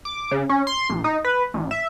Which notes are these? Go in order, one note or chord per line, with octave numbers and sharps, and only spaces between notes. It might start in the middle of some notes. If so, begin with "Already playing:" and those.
D6
C#3
C#4
C6
A#1
D#4
B4
A1
E5